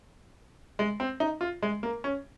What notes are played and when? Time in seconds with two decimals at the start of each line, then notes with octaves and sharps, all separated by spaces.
0.79 G#3
1.00 C4
1.20 D#4
1.41 F4
1.63 G#3
1.83 A#3
2.04 C#4